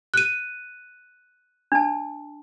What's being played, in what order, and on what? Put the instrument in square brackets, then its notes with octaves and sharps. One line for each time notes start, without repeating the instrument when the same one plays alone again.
[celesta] F#6 D#7
[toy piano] D4 A5